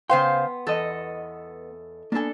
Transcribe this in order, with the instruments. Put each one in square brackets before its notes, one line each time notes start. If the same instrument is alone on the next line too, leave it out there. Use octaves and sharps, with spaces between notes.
[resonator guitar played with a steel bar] C#3 C5 F5 [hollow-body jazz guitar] B3 G5 [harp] C6
[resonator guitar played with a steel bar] E2 [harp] A4 D#5
[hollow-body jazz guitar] A#3 B3 G#5 [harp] D4 A4